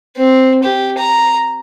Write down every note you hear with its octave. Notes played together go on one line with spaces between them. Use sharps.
C4
G4
A#5